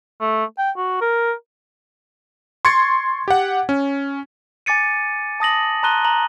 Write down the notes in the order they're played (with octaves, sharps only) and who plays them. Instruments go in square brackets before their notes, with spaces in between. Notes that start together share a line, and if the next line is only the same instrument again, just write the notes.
[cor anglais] A3
G5
F#4
A#4
[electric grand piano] C6 C#6 G#6 A6 C#7
G4 F#5
C#4
[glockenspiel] G#5 D6 A6 C#7 D#7
A5 D#6 A#6 F#7
A5 A#5 C6 F#6 D#7 G7
A#5 F#7